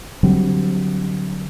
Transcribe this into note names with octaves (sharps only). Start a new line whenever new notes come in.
D3 F#3 G3 C4